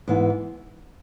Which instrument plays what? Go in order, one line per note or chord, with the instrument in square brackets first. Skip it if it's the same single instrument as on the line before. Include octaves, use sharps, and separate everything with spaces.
[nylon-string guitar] G#2 E3 B3